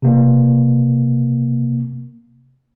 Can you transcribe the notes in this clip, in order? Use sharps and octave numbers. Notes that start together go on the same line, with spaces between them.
C3 A#3